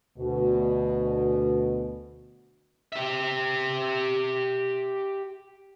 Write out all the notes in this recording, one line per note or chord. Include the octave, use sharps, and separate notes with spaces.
D2 B2
G4 E5